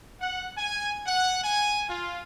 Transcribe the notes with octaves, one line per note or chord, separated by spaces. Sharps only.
F#5
G#5
F#5
G#5
F4